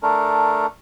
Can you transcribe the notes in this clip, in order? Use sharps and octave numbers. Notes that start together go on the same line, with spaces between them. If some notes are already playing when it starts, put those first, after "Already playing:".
A3 D4 A#4